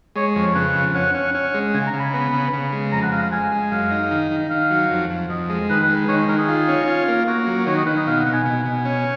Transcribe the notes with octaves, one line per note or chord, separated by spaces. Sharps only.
G#3 C#5
F2
C#5
C#3 B4
F2
C#4 F#5
C#4
C#4
G#3
C#3 G#5
A#5
C#3
B5
B3
C#3
C#3
G#3
F2 A#5
F#5
G#3 F5
F5
G#3 G#5
G#3
F#2 F5
D#4
D#3
D#3
D#3 F5
F#3
F2
F2
F2 D#5
G#3
D#3 B4
B4
G#3
B4
D#3 C#5
D#3 A#4
G#4
F4
C#4
F4
A#3
A#3 F#4
F#3
D#3 C#5
D#5
D#3 B4
D#5
B2 F5
F#5
B2
G#5
B2
B2
C#4